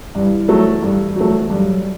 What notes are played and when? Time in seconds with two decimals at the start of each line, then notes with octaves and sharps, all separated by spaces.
0.14 G2 E3
0.48 F#3 A3
0.82 G2
1.16 F#3 A3
1.50 G2 F#3